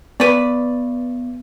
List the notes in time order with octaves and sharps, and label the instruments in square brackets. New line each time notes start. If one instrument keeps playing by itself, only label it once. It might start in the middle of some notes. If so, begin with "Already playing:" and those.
[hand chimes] B3 [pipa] B4 D5